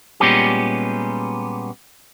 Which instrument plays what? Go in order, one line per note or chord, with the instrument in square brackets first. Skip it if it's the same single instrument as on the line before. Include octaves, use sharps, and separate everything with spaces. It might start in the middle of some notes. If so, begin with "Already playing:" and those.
[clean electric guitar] A#2 G3 G#3 B3 C#4 G4